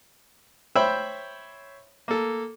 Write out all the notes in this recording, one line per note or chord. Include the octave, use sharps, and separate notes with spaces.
C5 C#5 E5 G5 B5
A#3 A4